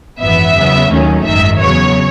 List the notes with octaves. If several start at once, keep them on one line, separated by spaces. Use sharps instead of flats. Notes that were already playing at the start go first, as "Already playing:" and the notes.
G#1 F#2 E3 B3 E5
E2 C#3 F#3 B3
D#2 D#3 F#3 A3 C#4
G#1 F#2 D#3 E5
E2 C#3 F#3 B3 C#5